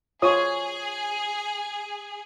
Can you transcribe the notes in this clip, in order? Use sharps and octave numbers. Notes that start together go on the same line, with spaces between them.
F4 G#4 C#5 D#6